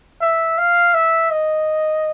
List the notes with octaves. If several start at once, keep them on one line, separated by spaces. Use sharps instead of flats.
E5
F5
E5
D#5